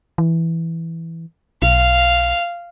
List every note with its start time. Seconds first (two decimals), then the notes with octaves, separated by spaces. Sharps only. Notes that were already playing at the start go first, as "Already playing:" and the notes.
0.18 E3
1.62 B1 F5